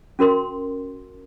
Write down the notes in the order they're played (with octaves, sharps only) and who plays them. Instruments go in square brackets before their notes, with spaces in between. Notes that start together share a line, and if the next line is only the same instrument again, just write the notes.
[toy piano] C#4 F#4 A#4 C6